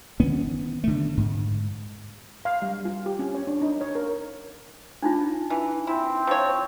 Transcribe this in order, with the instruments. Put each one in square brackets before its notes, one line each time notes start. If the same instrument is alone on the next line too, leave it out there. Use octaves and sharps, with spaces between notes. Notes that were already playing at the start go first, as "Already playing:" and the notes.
[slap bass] D#3 B3 C#4
D3 A3
G#2
[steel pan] F5
G3
F4
G4
C#4
C#5
D4
D#4
C#5
A#4
[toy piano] D4 D#4 F4
[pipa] E3
[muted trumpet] C4 [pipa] E4
[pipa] F3 C#5 [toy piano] C#6